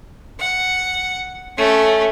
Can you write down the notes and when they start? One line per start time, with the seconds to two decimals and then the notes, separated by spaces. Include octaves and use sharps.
0.39 F#5
1.57 A3 C#4